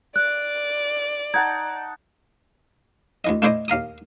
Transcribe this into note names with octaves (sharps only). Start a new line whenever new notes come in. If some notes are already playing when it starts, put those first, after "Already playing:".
D5 F#6
D#4 F#5 A5 G#6
D2 E3 D#5
A3 D4 E4 C5 D5 D#5
D#2 F5 A#5 D#6